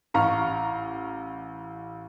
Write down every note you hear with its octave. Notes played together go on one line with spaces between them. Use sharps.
A1 F5 A#5 C#6 F6